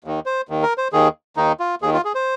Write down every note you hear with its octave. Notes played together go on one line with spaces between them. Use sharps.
D#2 D#3
C5
D#2 D#3
A#4
C5
D#2 D#3 G#4
D#2 D#3 D#4
F4
D#2 D#3 G#4
F4
G#4
C5